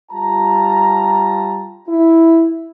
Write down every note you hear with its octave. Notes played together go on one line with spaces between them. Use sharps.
G3 F4 A5 A#5
E4